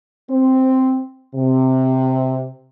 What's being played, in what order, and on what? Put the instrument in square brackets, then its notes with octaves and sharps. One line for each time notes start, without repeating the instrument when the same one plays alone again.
[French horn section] C4
C3